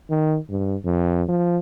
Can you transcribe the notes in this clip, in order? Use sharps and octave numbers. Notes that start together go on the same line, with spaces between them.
D#3
G2
F2
F3